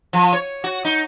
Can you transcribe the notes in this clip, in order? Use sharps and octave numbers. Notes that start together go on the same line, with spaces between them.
F3
C#5
F#4
D#4